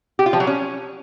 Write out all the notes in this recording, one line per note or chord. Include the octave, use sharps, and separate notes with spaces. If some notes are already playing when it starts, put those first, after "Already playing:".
G4
F4
F3
F#3
C#4